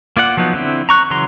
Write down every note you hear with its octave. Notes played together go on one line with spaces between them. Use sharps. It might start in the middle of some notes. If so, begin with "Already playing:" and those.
A#3 F4 D5 F#5
F3 F#3 B3 D#4
D3 C4 E4
A#5 C#6 F#6
C#3 E3 F#3 A#5 C6